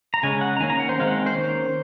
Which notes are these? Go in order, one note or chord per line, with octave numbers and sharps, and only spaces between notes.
A#5
C#3 G#3 C#4 G#5
F#5
A#5
D#3 A#3 C#4 G#5
A#5
F#5
C5
D#3 G#3 C4 F5
F#5
C5
D#3 A#3 C#4